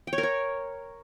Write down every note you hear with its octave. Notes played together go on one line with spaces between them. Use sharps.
G5
C#5
A#4
C#5